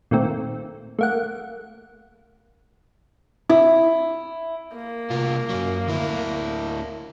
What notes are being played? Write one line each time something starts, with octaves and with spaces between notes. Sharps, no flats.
A#2 D#3 A3 C4
A3 A#3 F#5
E4
A#3
C2 F4
F#2 F#3
D2 E4